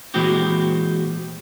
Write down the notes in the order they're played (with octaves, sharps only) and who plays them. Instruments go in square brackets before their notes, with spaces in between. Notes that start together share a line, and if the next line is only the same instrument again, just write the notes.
[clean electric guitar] A#2 E3 G#3 C4 F#4 G4